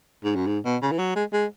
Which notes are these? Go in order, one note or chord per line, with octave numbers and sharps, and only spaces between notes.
G#2
F#2
G#2
B2
C#3
E3
F#3
G#3
G#3